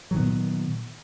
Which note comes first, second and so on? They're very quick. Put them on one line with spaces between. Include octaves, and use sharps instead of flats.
F#3 D#3 B3 A#2